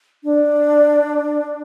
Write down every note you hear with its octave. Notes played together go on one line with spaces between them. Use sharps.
D4